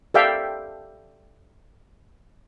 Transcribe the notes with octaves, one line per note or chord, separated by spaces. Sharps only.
G4 A4 D5 E5 F5 G5